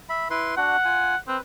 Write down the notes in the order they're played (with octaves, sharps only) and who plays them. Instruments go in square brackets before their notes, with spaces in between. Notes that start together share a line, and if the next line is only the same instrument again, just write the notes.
[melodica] E5 B5
E4 B4 C6
[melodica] D4 F#4 [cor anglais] F#5
[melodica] F4 G#5
[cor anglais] C4 [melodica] B4